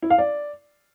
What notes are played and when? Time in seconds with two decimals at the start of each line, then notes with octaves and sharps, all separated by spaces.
0.03 E4
0.10 F5
0.18 D5